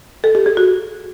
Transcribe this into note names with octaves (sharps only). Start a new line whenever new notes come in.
A4
G4
G#4
F#4